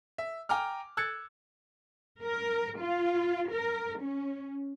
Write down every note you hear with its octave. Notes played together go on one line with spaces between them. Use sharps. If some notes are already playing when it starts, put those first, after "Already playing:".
E5
G5 G#5 A#5 D6 F6
E6 F#6 G#6 A6 C#7
A#4
F4
A#4
C#4